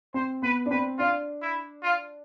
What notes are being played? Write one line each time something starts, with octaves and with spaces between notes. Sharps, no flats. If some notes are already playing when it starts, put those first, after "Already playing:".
C4 C5
B3 B4
D4
C4 B4
D4 F4
E4
F4